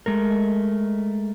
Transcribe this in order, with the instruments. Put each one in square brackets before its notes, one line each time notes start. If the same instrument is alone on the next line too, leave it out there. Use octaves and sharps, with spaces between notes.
[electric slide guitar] G#3 A3 A#4